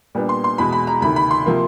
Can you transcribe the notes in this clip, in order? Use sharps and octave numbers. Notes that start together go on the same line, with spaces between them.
A#2 G3 B3 D4
C6
C6
E2 B2 G#3 B5
B5
A#5
D2 C3 D#3 B5
B5
C6
C3 F3 A#3